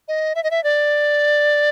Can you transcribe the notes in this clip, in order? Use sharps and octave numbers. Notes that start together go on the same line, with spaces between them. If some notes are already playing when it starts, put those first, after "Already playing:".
D#5
E5
D#5
E5
D5